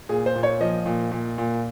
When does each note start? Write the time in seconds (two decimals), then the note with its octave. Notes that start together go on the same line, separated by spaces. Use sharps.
0.09 A#2 G#4
0.26 C5
0.35 A#2
0.43 C#5
0.61 F3 D#5
0.86 A#2
1.11 A#2
1.38 A#2